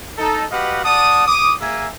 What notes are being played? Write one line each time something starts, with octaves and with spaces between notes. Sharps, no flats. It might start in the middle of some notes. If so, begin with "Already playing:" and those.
D#4 A4
F#4 G4 B4 D#5 F5 F#5
D5 F#5 A5 D#6
D6 D#6
A#3 G#4 E5 G#5